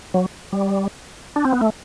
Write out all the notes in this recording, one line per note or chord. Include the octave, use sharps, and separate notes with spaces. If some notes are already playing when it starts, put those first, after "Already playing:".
F#3
G3
D4
C4
B3
A3